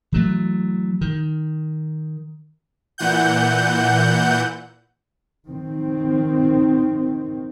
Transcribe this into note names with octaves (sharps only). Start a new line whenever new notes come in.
E3 F#3 A3
D#3
A#2 E3 F#5 G6
D#3 C4